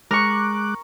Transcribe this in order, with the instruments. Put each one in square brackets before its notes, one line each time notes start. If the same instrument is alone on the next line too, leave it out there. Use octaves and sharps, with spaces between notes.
[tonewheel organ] G#3 D6 F#6 [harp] A#4 C#6